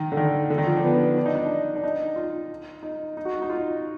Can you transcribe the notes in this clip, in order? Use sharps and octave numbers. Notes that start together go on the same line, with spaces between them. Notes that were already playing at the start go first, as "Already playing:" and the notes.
Already playing: D#3
D3
D#3
D3
D#3
F3
D4
B3
D4
D#4
D4
D4
D#4
F4
D#4
D#4
F#4
D#4
F4